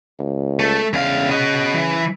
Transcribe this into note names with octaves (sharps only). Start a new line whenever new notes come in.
C#2
A3
E2 C#3 F5
F#4 D#5
E3